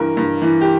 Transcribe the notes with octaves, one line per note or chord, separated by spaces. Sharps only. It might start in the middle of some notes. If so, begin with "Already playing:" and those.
Already playing: G2 E3 A#4
G2
E3
G4